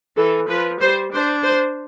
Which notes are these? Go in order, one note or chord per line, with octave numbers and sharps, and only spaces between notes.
E3 A4
F3 B4
G3 C5
D4 C5
C5